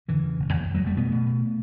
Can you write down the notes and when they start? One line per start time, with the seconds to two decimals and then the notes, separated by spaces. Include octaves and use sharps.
0.08 E2 D3 E3
0.24 C#3
0.39 E1
0.53 D#2 D#3 F3
0.68 F1
0.74 F#3 G#3
0.83 F1 G3 A3
0.96 B2 A3 B3
1.12 B2
1.26 B2